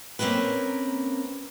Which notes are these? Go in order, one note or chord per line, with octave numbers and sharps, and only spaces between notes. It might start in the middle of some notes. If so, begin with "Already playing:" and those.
A#3 C4 C#4 A#4 B4